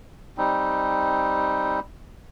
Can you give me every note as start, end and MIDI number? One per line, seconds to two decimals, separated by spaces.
0.38 1.80 55
0.38 1.80 60
0.38 1.80 63